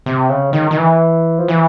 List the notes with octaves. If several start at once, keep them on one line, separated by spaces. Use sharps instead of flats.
C3
C#3
D#3
D#3
E3
F3
E3